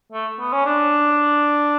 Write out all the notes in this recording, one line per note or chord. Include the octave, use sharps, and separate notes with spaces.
A3
B3
C#4
D4